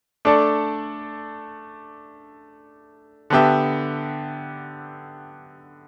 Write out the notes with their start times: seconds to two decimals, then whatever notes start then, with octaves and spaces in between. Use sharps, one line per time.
0.25 A3 D4 A4 D5
3.30 D3 B3 G4 E5